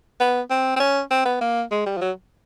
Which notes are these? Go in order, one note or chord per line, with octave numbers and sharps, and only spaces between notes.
B3
C4
C4
C#4
C4
B3
A#3
G#3
G3
F3
F#3